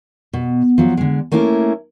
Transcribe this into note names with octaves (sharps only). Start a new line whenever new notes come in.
B2
F3 F#3
D3 G#3
A3 A#3 C#4 E4 A#4